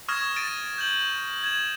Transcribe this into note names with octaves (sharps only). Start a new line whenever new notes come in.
C#6 D#6 F6 G#6 A#6 E7
A6 D7 D#7
G6 F#7
G#6 E7